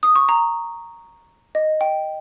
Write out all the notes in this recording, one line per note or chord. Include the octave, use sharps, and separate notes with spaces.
D#6
C#6
A#5
D#5
G5